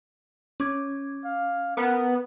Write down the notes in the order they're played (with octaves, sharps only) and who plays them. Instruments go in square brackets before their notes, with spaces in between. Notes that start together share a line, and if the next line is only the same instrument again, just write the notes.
[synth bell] C#4 D6 G#6
[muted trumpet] F5
[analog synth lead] B3 [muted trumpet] A#4